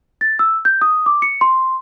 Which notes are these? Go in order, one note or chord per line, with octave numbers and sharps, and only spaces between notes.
A6
E6
G6
D#6
D6
C#7
C6